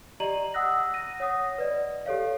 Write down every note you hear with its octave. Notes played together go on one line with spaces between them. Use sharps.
G4 D5 D#5 A#5 D#7 F#7
F#5 D#6 E6 F#6 A#6
A#6 D#7
C#5 F#5 D#6 A#6
B4 D5 D#5
G4 A4 C#5 F5